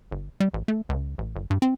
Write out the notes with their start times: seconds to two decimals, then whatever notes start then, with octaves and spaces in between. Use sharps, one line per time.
0.11 G1
0.40 G3
0.54 A1
0.68 A3
0.89 C#2
1.18 A1
1.36 G1
1.50 G2
1.62 C4